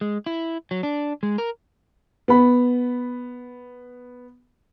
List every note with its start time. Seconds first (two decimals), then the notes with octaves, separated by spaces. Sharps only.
0.01 G#3
0.26 E4
0.71 F#3
0.83 D4
1.23 G#3
1.38 A#4
2.28 B3 B5